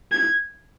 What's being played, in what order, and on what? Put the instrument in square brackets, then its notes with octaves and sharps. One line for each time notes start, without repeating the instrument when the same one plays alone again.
[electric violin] G#6